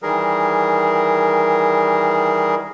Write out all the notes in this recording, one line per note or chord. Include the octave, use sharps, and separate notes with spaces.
D#3 E3 G3 G#4 A#4